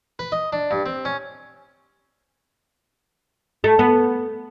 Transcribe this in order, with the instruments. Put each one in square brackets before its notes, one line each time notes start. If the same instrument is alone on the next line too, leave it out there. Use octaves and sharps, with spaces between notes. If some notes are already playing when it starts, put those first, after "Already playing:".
[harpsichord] B4
D#5
D4
G2
C4
C#4
[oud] A3
B3